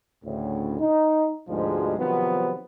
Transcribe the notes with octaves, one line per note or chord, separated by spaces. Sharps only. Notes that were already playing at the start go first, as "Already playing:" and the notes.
D2 A2 C#3
D#4
D2 G#2 B2 F3 G3 G#3
C3 D#3 F3 F#3 B3